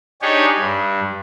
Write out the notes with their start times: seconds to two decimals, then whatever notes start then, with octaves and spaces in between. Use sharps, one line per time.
0.22 D4 D#4 G4 G#4 C#5
0.59 G2